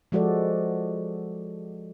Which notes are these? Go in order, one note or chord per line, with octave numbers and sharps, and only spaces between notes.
F3 G#3 F#4 A4 D5